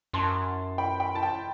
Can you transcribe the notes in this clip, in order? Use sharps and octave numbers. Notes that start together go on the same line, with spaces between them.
F#2 A5 C6
G5 B5
G5 B5
A5
G5